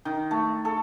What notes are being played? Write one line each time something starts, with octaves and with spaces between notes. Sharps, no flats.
D#3
A3
A4